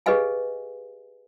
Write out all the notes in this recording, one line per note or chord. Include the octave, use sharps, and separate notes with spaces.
G4 G#4 B4 D#5 F5 G#5